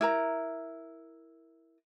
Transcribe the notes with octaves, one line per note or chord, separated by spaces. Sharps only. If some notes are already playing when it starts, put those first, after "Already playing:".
E4 A#4 A#5